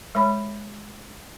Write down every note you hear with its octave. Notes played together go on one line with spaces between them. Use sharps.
G#3 C#5 B5